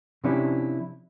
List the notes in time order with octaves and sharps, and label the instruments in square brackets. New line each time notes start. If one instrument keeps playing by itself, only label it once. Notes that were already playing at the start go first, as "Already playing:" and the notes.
[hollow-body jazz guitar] C3 F3 C#4 D4 E4 G4